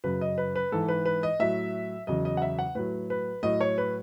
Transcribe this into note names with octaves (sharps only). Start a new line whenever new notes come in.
F#2 C#3 F#3 B4
D#5
B4
B4
G#2 E3 A4
B4
B4
D#5
A2 F#3 E5
E2 C#3 F#3 D#5
D#5
F#5
E5
F#5
A2 F#3 B4
B4
A2 F#3 D#5
C#5
B4